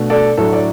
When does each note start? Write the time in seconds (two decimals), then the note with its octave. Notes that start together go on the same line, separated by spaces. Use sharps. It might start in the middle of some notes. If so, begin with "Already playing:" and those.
Already playing: B2 A3 D4
0.10 A4 D5
0.38 A2 F#3 D4 A4
0.53 D5